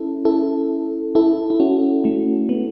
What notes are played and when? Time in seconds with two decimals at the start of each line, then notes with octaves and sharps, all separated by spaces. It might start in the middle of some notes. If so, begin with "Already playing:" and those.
Already playing: C#4 E4 A4
0.25 E4 A4
1.15 E4 A4
1.50 E4
1.60 C#4 F#4
2.04 A3 C#4
2.49 B3